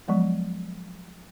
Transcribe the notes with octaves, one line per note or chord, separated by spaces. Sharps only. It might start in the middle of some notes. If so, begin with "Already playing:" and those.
F3 F#3 G#3 B3